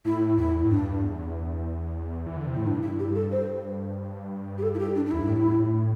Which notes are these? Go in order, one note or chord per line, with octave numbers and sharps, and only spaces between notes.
A2 E4
E2 E4
A2
G2 D4
E2
E3
D3
C3
A2 E4
G2 D4
E4
G4
A4
C5
G4
A4
E4
G4
D4
D4
E2 E4
G2
A2